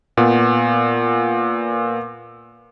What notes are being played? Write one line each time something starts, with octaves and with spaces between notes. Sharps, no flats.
A#2 B3